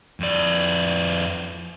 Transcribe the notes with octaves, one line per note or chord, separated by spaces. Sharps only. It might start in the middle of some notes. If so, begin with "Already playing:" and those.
F2 D5